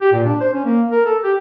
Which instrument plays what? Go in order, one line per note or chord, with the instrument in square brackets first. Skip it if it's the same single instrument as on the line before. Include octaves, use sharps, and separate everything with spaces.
[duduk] G4
A#2
D4
C5
C#4
A#3
A#4
A4
G4